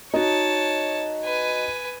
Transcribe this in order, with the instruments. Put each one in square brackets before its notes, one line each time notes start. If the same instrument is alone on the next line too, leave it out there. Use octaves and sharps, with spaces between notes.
[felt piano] D#4 F#4 [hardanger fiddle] C#5 A5
[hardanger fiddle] B4 G#5